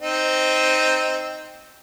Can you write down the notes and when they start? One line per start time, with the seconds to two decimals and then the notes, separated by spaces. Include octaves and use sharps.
0.01 C4 D#4